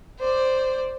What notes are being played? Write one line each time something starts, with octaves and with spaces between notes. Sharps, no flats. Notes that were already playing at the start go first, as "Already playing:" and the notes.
C5 D5